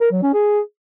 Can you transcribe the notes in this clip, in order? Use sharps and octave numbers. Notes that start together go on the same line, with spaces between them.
A#4
F#3
C#4
G#4